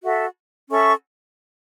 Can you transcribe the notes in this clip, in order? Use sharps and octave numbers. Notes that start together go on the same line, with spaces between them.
F#4 A4 E5
C#4 A4 E5 C#6